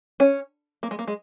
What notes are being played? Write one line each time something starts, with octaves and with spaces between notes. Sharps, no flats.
C#4
A#3
G#3
A#3
G#3